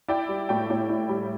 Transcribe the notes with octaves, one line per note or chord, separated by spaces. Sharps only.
E4 D5 G5
G3
A2 D5 G5
A2
E4
G3